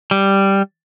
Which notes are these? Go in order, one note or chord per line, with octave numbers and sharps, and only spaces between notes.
G3